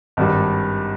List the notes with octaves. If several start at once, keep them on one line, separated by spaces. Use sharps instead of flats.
G#1 G2 G3